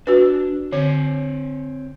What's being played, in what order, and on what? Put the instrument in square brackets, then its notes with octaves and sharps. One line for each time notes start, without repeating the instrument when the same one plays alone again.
[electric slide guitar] D4 [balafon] F#4 B4
[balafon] D3 [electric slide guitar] C4 C#5